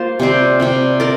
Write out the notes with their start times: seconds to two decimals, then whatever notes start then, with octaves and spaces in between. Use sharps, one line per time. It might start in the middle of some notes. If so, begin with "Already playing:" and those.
Already playing: A#3 F4 C5
0.20 C3 G3 C4
0.60 C3 G3 C4
1.00 A#4 D5